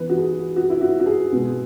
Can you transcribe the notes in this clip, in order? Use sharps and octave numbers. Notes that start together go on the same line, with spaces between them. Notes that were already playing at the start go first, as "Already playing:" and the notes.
Already playing: E3 B3 D#4 B4
F#4
G#4
F#4
E4
F#4
F#4
G#4
B2 G#3 B3